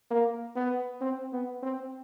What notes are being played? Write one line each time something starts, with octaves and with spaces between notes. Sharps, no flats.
A#3
B3
C4
B3
C4